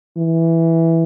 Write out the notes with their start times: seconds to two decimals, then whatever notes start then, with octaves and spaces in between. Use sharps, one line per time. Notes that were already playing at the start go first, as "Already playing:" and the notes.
0.17 E3